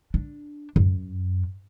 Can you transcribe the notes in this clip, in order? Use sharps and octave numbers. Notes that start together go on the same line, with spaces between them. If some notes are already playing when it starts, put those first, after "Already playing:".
D4
F#2